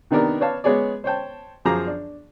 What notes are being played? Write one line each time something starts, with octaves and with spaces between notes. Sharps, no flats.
C3 D#3 B3 D4 A#4
B4 C#5 D5 F5 A5
G#3 B3 C#4 G#4 C#5 D5
C5 C#5 G5 A5
F#2 F3 G#4 A#5 D6
D4